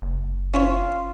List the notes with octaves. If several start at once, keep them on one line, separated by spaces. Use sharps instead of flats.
F#1
C#4 E4 F4 C#5